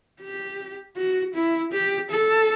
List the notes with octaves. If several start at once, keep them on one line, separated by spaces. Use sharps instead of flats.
G4
F#4
E4
G4
A4